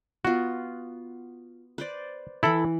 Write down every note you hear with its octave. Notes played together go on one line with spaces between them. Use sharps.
B3 F4 F#4
B4 C5 D5
E3 E4 A4 B5